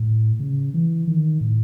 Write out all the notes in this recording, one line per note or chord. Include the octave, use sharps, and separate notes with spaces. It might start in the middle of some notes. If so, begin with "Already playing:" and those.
Already playing: A2
C#3
E3
D#3
A2